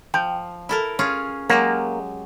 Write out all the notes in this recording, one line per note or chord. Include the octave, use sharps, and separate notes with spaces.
F3 G5
E4 A4 A#4
C#4 F4 G#4
F#3 G#3 A#3 G4